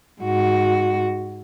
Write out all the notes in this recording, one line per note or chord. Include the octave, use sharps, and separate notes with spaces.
G#2 F#4